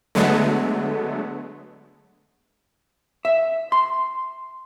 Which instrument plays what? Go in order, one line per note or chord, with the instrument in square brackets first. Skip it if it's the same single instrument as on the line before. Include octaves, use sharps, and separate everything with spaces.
[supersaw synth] D3 F#3 G#3 A3 B3
[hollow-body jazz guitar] E5
C6